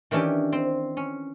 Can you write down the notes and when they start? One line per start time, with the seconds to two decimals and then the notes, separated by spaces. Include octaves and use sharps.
0.11 D#3 E3 C#4 D4 G4
0.52 C4
0.97 C#4